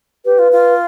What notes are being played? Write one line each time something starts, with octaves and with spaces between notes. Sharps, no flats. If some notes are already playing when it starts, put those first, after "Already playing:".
G4 B4
F4
F4